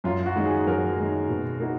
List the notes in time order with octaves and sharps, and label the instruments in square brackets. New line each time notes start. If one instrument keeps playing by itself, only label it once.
[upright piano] F#2 [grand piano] F4
[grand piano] F#4
[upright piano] D#3 G#3 D#4
[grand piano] G#4
[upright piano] F#2 [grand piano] A#4
[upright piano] D#3 G#3 D#4
B2
A#3 D#4 F#4